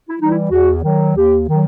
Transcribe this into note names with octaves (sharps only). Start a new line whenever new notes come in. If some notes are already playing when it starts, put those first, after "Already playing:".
E4
E3 G3 D#4
E4
E2 F#4
D#3 F#3
D#2 G4
D#3 F#3